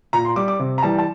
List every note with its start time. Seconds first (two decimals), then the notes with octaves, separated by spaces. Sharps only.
0.13 A#2 A#5
0.25 C6
0.36 G3 D6
0.48 D6
0.59 C3
0.78 A#5
0.83 E3 G3 A5
0.98 A5